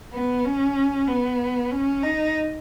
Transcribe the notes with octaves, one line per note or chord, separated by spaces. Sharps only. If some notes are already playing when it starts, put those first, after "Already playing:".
B3
C#4
B3
C#4
D#4